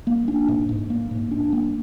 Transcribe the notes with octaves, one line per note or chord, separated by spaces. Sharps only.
A#3
D4
G#2
G#2
A#3
G#2
D4
A#3